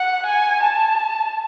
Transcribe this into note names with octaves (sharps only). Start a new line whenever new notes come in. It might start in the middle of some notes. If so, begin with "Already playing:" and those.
Already playing: F#5
G#5
A5